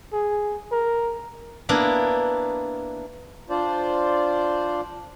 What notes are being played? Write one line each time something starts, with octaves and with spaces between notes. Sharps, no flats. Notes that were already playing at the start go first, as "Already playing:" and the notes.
G#4
A#4
A#3 B3 D4 E4
D4 F4 C5 D5